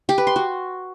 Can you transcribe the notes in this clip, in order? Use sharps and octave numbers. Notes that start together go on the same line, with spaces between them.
G4
B4
C6
F#4